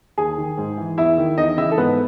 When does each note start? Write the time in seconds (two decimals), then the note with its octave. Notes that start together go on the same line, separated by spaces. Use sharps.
0.18 D#2 G#4 G#5
0.38 D#3
0.58 G#2
0.78 E3
0.98 E2 E4 E5
1.18 D#3
1.38 E2 D#4 D#5
1.57 C#3 E3 E4 E5
1.71 A4
1.78 G#2 B3 B4